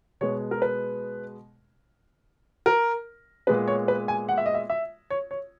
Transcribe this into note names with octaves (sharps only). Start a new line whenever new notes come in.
B2 G#3 B3 C#5
A#4
B4
A#4
A#2 G#3 B3 B4
C#5
B4
G#5
F#5
E5
D#5
E5
E5
C#5
C#5